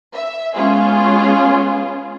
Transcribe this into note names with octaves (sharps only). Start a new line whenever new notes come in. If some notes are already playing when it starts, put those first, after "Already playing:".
E5
G#3 B3 C#4 F4 G#4